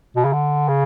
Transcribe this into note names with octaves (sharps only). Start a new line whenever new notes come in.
B2
C#3
D3
C#3